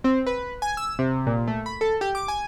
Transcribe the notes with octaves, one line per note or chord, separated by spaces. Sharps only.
C4
B4
G#5
E6
C3
A#2
A3
B5
A4
G4
D6
G#5